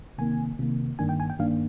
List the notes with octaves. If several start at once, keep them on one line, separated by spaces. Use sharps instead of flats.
C3 D#3 A#3 G#5
C3 D#3 A#3
G2 D#3 A#3 D4 G#5
G5
G#5
G5
G2 D#3 A#3 D4 F5